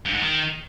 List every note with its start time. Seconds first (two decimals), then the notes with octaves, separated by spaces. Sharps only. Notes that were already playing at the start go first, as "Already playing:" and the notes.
0.05 G2
0.13 G#2
0.21 D#3